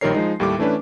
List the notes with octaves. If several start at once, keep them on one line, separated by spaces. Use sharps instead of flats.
A#1 D#3 G3 A#4 C#5 C7
F3 G#3 D#4
D#2 A2 G3 A3 G4 D6
E3 A3 C#4 D4 B4